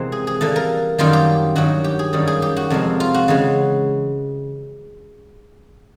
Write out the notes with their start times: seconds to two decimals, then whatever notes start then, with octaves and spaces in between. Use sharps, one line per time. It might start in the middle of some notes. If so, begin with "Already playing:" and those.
Already playing: C3 E3 G#3 A#3 C4 C5
0.12 G#4
0.27 G#4
0.41 E3 G3 A#3 A4
0.56 A#4
0.98 F#2 D#3 G3 A#3 F4
1.13 G4
1.55 G2 D#3 F#3 F#4
1.84 G4
1.99 G#4
2.13 F#2 D#3 G3 A#3 C#4
2.27 G#4
2.42 G4
2.56 F#4
2.70 F2 C3 F3 G#3
3.00 F4
3.14 F#4
3.28 C#3 E3 G#3